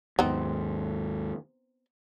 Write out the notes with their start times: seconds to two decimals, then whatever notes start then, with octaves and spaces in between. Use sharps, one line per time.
0.19 D#2 G#2 B3 C4 D#4